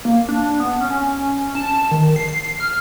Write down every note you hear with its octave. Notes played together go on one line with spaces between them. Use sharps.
A#3
D4
B3
C#4
A5
D#3
C7
F6